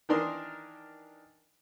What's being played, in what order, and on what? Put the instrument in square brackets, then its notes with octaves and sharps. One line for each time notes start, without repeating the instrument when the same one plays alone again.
[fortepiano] D#3 E3 D4 A#4 C6 D#6